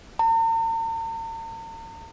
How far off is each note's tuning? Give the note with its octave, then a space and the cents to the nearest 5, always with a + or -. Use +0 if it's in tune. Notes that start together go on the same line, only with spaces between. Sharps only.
A#5 -45